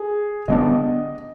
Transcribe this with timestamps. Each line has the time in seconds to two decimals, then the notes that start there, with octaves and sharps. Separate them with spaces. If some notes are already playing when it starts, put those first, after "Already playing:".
Already playing: G#4
0.48 D3 G#3 B3 D4 D#5